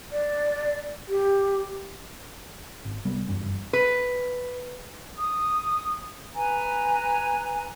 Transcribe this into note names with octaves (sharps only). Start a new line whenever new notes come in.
D5
G4
G#1
C2 G3 B3
F#1 E2 G2 C#4
B4
D#6
B4 G#5 A#5